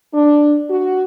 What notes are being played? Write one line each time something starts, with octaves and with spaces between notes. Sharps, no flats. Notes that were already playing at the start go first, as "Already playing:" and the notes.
D4
F#4